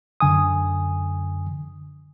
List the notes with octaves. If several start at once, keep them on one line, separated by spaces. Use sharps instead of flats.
F#2 D3 G#5 D#6